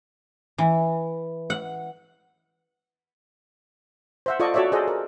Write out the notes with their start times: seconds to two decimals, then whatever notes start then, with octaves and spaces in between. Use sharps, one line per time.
0.58 E3
1.50 F#5
4.26 C5 E5 F#5
4.40 F4 A4 D5 D#5 C#6
4.54 F#4 A4 C#5 D5 E5
4.72 G#4 A4 C5 D5 D#5
4.88 A#4